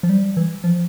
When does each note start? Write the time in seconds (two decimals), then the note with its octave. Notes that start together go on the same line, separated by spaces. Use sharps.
0.03 F3
0.09 G3
0.37 E3
0.64 F3